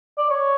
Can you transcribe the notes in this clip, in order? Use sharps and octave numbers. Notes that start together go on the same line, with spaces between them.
D5
C#5